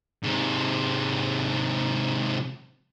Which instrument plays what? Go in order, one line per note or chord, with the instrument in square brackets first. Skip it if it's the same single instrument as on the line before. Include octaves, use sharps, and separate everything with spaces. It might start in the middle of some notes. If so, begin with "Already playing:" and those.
[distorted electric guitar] G#2 C3